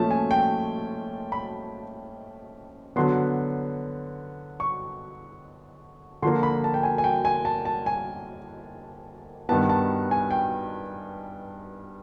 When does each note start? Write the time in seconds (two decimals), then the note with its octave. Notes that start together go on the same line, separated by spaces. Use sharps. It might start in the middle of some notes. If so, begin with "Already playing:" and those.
Already playing: A#2 F3 A3 C#4 A5
0.11 G#5
0.31 G5
1.32 B5
2.96 D3 F#3 B3 C6
4.60 C#6
6.22 D3 F3 A#3 C6
6.43 B5
6.64 A5
6.74 G5
6.83 G#5
6.98 G#5
7.04 G5
7.25 G#5
7.45 A5
7.65 A5
7.86 G#5
9.49 G2 D#3 G3 B3 A5
9.69 A5
10.11 G#5
10.31 G5